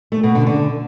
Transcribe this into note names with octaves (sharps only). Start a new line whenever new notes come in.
A3
B2
D3
D3